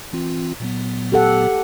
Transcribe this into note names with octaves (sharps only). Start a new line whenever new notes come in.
E3 C4 F4
A#2 F#3 B3
G4 A4 F#5